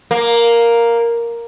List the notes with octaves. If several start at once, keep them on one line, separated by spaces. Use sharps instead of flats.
A#3